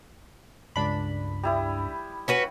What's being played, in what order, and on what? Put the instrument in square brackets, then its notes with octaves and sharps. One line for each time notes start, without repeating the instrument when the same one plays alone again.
[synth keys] C#2 D4 B5 [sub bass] G2
[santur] G3 E4 D#6
[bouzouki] C#4 F#4 B4